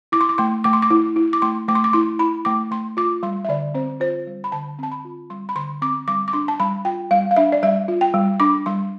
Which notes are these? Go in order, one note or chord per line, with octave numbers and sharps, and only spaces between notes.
E4 D6
C6
D6
A3 C6
A3 D6
C6
D6
E4
E4
D6
A3 C6
A3 D6
C6
D6
E4 C6
E4 B5
A3 D6
A3 C6
F4 D6
G3 C6
E5
D3 D5
C4 C5
F4 C5
G3
B5
D3 A5
C4 A5
B5
F4
G3 C6
B5
D3 C6
C4 D6
G3 D6
D6
D4 C6
A5
G3 B5
F4 G5
G3 F5
F5
D4 E5
D5
G3 E5
F4
G5
G3
D4 D6
G3 C6